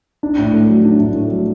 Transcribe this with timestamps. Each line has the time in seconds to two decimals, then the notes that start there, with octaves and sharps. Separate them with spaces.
0.23 D4
0.38 A2
0.54 A3
0.69 F#3
0.85 D4
1.00 A2
1.16 A3
1.32 F#3